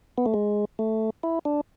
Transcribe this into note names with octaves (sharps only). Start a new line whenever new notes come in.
B3
A3
G#3
A3
E4
D4